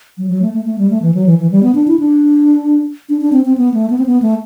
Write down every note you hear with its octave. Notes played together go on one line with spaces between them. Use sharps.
F#3
F#3
A3
A3
A3
G3
A3
E3
F#3
E3
E3
G3
B3
D4
E4
D4
D4
D4
C4
C4
B3
A3
B3
C4
B3
A3